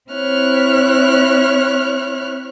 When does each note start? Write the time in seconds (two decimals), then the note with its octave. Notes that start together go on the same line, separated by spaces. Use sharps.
0.10 C4 E4 C#5 F6 F#6